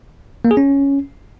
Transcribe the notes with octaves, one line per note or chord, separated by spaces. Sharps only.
A#3
G#4
C#4